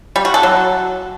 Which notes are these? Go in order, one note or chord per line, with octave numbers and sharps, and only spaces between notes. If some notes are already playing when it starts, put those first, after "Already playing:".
G3
F#4
A4
F#3